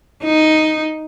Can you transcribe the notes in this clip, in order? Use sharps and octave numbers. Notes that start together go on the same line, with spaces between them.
D#4